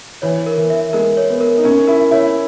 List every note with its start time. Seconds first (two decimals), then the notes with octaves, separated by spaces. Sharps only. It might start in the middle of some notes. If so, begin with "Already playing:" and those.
0.22 E3 C#5
0.46 A#4
0.58 E3
0.70 E5
0.93 G#3 A#4
1.17 C#5
1.29 B3
1.41 A#4
1.58 D#4
1.64 C#4 A#4
1.87 E4 A#4
2.11 E4 C#5